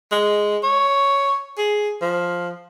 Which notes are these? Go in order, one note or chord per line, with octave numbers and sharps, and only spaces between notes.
G#3
C#5
G#4
F3